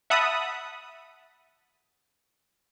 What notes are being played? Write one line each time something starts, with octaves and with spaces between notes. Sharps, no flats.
E5 F#5 A5 B5 D#6